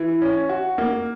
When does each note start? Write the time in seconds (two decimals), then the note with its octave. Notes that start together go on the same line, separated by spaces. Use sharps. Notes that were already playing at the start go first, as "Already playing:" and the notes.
Already playing: E3
0.22 C#4
0.49 F#4
0.78 A#3